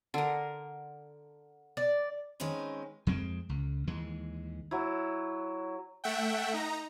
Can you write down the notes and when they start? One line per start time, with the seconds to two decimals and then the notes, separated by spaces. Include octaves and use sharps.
0.14 D3 A#4
1.77 D5
2.40 D#3 G#3 C4 C#4 B4
3.07 F2 G#3 C4
3.49 C#2
3.87 D#2 E3 G#3
4.71 F#3 E4
6.04 A3 E5 F#5 G5
6.54 D#4 A#5